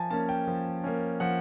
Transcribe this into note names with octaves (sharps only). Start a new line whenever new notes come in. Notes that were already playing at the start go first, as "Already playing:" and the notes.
Already playing: F3 G#5 A5
A#3 C#4 A5
G5
F3
A#3 C#4
F3 F#5